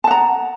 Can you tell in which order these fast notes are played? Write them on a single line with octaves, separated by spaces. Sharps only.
A5 F#5 A#5